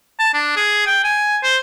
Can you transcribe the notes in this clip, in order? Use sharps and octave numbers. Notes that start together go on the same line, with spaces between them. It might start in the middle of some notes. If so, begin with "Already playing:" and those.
A5
D4
G#4
G5
G#5
C5